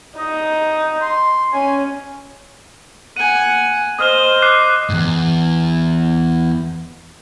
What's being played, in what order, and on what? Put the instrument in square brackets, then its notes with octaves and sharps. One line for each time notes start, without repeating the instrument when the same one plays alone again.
[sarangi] D#4 [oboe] D#5
[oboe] C6
[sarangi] C#4 [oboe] G#5
[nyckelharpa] F#5 G#5 [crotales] D#7
[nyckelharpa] C5 D#5 [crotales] D#6 F6 G7
[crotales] D6 F#6 C7
[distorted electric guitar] E2 G#2